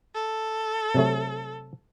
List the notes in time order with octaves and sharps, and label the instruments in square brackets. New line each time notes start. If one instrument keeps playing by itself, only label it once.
[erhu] A4
[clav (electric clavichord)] C3 F#3 A3